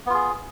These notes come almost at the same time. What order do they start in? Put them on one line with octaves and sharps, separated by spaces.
B3 F4 G#4